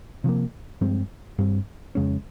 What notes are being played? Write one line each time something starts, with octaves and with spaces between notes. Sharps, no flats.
C3 F3 A#3
G2 F3 G#3 C4
G2 G3 C4
F2 C#3 G#3 C#4